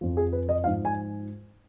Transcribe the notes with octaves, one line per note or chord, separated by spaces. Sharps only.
F2 F3
G#4
B4
D#5
G#2 F3 F5
G#5